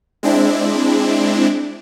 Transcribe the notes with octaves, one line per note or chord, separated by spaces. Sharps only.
G#3 C4 D4 E4